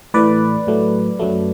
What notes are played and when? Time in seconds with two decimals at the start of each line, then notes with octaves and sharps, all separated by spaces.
0.14 A2 E3 A3 B4 D5
0.67 A2 F#3 A3
1.19 F#2 F#3 A3